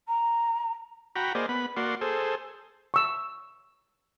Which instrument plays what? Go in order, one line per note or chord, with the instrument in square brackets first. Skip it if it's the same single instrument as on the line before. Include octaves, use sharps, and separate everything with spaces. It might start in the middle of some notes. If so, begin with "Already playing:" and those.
[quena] A#5
[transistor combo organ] F#4 G5 A#5 B5
A#3 G#4 C5 D5 D#5
B3 B5
A#3 F#4 D5 C6
G#4 A4 C5
[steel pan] C#6 E6